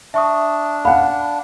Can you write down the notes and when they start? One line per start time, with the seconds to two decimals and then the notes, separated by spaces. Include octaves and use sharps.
0.14 D4 E5 C#6 D#6
0.85 F5 F#5 B5